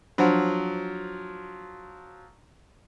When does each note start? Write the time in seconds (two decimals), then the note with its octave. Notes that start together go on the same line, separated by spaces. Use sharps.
0.18 F3 F#3 D4 C5 F#5